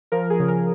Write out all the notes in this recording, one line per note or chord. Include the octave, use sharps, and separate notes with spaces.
F3 A#4
G#4
C#3
A#4